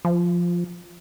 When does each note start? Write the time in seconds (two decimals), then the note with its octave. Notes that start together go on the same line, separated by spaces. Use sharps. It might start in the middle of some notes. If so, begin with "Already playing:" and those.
0.05 F3